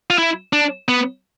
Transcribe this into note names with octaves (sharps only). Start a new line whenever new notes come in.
F4
E4
D4
B3